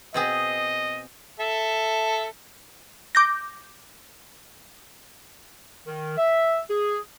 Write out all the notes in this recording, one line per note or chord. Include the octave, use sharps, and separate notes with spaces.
B2 C4 G#4 D#5
A4 E5
D6 G6 A#6
D#3
E5
G#4